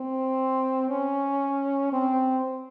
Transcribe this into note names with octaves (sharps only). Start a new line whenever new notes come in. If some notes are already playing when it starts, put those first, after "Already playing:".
Already playing: C4
C#4
C4